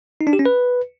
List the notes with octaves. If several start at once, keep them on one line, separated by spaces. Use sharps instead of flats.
D#4
D4
G4
C#4
B4